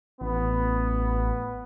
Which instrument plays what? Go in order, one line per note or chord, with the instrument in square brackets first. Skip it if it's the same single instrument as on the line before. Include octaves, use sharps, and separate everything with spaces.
[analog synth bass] A1 [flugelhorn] B3